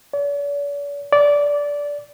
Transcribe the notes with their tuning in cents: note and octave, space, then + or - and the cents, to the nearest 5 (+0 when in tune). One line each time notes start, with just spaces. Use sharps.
D5 -45
D5 -15